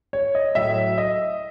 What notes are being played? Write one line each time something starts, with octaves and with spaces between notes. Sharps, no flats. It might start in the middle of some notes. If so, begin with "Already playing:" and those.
C#5
D#5
A2 F#3 A3 E5
D#5